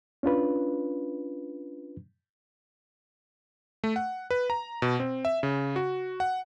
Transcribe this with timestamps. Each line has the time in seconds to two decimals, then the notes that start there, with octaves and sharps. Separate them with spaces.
0.23 C#4 D4 F4 B4
3.84 A3
3.96 F#5
4.30 B4
4.50 A#5
4.82 B2
5.00 C4
5.25 E5
5.43 C#3
5.76 F#4
6.20 F#5